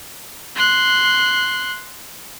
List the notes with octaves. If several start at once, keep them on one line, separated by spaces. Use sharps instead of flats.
C6 F#6